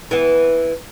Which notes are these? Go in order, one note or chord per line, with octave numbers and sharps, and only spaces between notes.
E3 B3